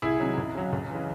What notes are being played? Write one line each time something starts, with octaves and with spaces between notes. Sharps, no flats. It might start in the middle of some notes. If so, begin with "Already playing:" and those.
C2 E4 G#4
C3 D#3 F#3
C#2
C#3 F#3
C#2
C#3 E3